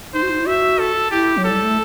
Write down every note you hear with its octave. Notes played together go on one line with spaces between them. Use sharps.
D#4 C5
F#4
D#4
E4
F#4 E5
A4
E4 G4
F#3
A4
G3
A3